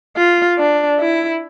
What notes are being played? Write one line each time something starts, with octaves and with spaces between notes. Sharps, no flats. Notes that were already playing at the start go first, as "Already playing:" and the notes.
F4
D4
E4